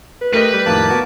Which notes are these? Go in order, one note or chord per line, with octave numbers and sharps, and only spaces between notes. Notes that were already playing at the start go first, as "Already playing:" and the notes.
B4
A3 G4 A#4 B4 D#5 B5
G3
F2 A2 D#3 A#3 A5 D6
B3 F#4